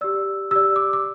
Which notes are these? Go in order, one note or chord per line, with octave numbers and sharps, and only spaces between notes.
G4 D5 E6
G4 D5 E6
D6
D6